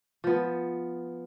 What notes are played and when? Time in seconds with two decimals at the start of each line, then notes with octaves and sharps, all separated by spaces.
0.24 F3 B3